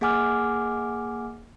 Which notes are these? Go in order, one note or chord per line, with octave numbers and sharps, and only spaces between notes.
A#3 G#4 F#5 G#5 D6 F6